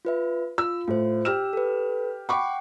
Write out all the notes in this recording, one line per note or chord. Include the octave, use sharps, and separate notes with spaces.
F4 B4 E5
F4 E6
A2 F4 C5
G4 E6 F6 E7
A4 B4
F#5 G5 B5 C#6 D6